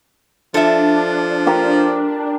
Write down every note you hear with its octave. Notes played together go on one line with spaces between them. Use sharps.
F3 D4 A4 E5
F4 G4 A#4